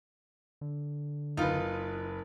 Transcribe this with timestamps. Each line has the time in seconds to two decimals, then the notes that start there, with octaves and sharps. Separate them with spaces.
0.61 D3
1.37 F#1 D#4 F4 B4